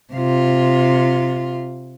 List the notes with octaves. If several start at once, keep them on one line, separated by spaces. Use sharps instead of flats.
C3 F4